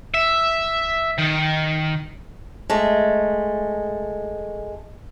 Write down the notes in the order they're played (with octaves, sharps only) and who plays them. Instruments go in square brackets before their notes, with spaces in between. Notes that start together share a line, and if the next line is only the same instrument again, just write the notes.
[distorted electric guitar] E5
D#3
[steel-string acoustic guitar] G#3 A3